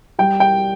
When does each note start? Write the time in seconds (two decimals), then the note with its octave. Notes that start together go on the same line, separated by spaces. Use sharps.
0.19 G3 G5
0.40 G5